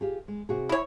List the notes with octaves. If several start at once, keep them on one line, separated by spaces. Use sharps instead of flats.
F4 G4 G#4
G#3
C3 F#4 G#4
E4 C#5